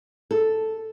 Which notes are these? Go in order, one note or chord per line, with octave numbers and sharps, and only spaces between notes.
A4